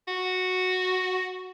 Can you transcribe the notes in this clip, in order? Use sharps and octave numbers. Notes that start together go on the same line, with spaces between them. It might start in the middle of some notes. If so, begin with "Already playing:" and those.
F#4